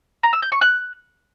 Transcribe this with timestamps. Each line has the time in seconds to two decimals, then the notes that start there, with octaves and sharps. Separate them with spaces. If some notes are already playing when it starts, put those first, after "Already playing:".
0.23 A#5
0.33 E6
0.42 G6
0.52 C#6
0.61 F#6